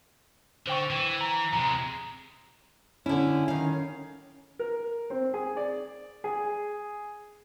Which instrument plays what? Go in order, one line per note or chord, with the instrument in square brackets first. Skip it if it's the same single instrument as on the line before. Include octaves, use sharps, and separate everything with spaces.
[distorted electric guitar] D3 [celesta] C5 G5 C#6
[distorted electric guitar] E3
[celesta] A#5
[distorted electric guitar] C3 G#3 [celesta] A#5
[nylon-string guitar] D3 E4 [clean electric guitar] C#4
[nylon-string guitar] D#3 F5
[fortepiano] A#4
C4
G#4
D5
G#4